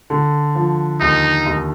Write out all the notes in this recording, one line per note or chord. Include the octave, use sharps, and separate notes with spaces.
D3
F3
D#2 D#4
D#2